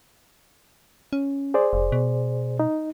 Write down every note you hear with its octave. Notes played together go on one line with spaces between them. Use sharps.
C#4
G#4 C5 D5
F1
B2
D#4